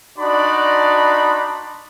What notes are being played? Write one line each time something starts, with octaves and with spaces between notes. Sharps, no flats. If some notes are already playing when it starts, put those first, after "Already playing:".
D4 D#4 F#4 D5 B5 C6